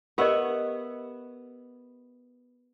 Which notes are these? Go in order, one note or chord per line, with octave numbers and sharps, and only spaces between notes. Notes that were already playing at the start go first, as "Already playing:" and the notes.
B3 G4 A#4 D#5 E5 F#5